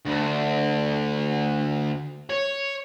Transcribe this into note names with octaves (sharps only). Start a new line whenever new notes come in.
D2
C#5